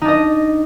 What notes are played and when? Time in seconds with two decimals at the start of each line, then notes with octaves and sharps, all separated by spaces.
0.01 D#4
0.05 D4
0.08 D#5